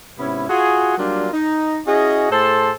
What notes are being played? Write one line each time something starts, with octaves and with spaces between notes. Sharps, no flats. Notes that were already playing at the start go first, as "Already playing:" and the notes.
G#2 C3 B3 C#4 E4
F4 F#4 G#4
F#3 G3 A#3 D4 F4 G4
D#4
C#4 E4 F#4 G#4 D#5
A2 G#4 A4 C5 A5 C6